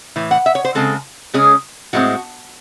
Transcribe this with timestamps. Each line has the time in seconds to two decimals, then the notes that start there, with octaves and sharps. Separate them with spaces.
0.16 A2 E3
0.31 F#5
0.46 E5
0.55 C#5
0.65 C5
0.75 C#3 G#3 C4 A4
1.34 C#3 G#3 C#4 G#4
1.93 A2 G#3 C4 F#4